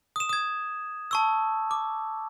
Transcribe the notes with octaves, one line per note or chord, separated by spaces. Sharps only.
D#6 E7
D#6 G#6
A5 C#6 E6
D6